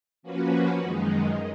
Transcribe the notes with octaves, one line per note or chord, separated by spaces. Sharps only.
F3 A#3 C#4 F#4 B4
F#2 D#3 G#3 D#4